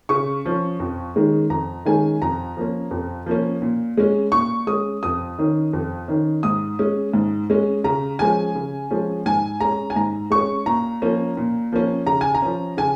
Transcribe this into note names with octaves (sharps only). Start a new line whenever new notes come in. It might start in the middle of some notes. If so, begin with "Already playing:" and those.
C#3 C#6
F3 C#4
F2
D#3 G#3 C#4
F2 A#5
D#3 G#3 C#4 G#5
F2 A#5
F3 A#3 C#4
F2
F3 A#3 C#4
A#2
G#3 C#4
A#2 C#6
G#3 C#4 D#6
F2 D#6
D#3 C#4
F2
D#3 C#4
G#2 D#6
G#3 C#4
G#2
G#3 C#4
C#3 A#5
F3 G#3 C#4 G#5
C#3
F3 G#3 C#4
G#2 G#5
G#3 C#4 A#5
G#5
G#2 A#5
G#3 C#4 C#6
A#2 A#5
F3 A#3 C#4
A#2
F3 A#3 C#4
C#3 A#5
G#5
A#5
F3 C#4
C#3 G#5